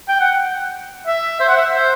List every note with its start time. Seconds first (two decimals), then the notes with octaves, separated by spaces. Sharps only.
0.09 G5
0.20 F#5
1.07 E5
1.40 C5
1.48 F#5
1.57 E5
1.73 C5